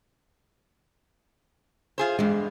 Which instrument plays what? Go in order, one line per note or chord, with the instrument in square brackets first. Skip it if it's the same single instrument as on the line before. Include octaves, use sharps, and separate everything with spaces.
[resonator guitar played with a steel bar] F4 G#4 C5
[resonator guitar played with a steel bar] E2 G2 [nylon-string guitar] G#3